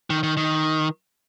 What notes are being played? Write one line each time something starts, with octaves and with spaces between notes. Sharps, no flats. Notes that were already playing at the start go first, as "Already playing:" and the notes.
D#3
D#3
D#3